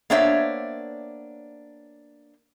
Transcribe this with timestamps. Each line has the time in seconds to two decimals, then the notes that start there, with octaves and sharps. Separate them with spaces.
0.10 A#3 B3 D4 C5 C#5 E5